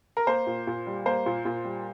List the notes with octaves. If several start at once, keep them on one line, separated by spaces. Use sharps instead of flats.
A#4
A#3 C5
A#2
A#2
G3
A#3 C5
A#2
A#2
G3